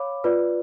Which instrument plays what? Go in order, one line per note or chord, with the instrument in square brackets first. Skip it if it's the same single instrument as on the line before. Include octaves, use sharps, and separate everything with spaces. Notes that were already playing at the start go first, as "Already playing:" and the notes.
Already playing: [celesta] C#5 F5 B5 D6
F4 B4 D5